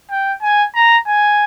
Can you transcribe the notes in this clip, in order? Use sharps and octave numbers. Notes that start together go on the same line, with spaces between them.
G5
G#5
A#5
G#5